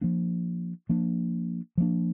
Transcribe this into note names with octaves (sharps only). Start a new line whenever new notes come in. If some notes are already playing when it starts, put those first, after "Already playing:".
F3 A#3 D4
F3 A#3 D4
F3 A#3 D4